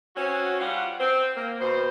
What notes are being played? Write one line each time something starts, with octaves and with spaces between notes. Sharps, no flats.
C4 C#4 F#4
G3 F4 F#5
C4
A#3
D#2 B2 C5